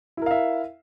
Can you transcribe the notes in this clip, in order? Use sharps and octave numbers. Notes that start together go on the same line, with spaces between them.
E4 A#4 E5 F5